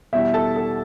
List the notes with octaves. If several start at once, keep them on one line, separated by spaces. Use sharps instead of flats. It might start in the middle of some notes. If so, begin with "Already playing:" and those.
E2 B2 G3 E4 E5
A4 A5
A4